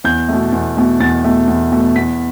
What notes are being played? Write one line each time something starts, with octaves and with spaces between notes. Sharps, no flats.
E2 G6
B2 A3
E2
B2 A3
E2 A6
B2 A3
E2
B2 A3
E2 B6